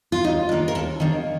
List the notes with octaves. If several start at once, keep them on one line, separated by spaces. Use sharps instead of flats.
F4
D#2 D#4
D#3 A#3 D4
A#4
D#2 A4
D#3 A#3 D4